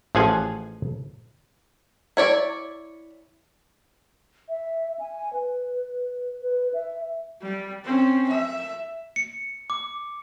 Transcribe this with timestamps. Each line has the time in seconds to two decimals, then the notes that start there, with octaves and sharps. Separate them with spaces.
0.15 A1 F3 G#4 F5 F#5 G#5
2.17 E4 C#5 D5
4.49 E5
4.99 G#5
5.33 B4
6.42 B4
6.74 E5
7.42 G3
7.84 C4 C#4
8.28 E5
9.16 C#7
9.70 D6